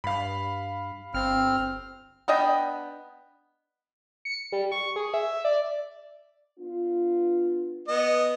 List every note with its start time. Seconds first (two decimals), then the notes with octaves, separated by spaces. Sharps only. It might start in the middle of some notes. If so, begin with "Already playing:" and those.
0.04 G2 F5 B5
1.14 G1 C4 F6
2.28 B3 D4 D#5 G5
4.25 C#7
4.52 G3
4.72 C#6
4.96 G#4
5.14 E5
5.45 D5
6.59 B3 D4 F4
7.88 B3 D#5